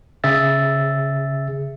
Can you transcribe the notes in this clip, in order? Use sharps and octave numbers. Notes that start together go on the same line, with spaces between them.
C#3 G#4 E5 E6 A6